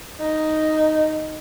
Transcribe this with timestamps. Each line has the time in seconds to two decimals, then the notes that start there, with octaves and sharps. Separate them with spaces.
0.20 D#4